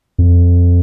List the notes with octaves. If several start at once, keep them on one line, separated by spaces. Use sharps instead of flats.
F2